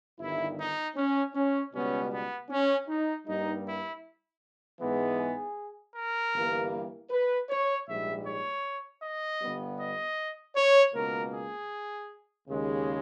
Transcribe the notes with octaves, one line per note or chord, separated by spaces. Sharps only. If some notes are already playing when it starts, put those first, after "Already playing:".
G1 G2 D#3 E4
D#4
C#4
C#4
C#2 B2 G3 B3 C#4
B3
C#4
D#4
G2 G3 A#3 D#4
E4
G#2 E3 G#3 B3
G#4
A#4
G1 G2 E3 G3 A#3
B4
C#5
A#1 G#2 G3 E5
C#5
D#5
G1 G2 G3 B3
D#5
C#5
C#2 B2 A#3 A#4
G#4
D#2 C#3 G#3